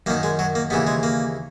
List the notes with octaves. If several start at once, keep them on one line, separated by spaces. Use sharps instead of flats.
F#2 D#3 A#3
G#3
F#3
A#3
D#2 C#3 E3 B3
G#3
A#3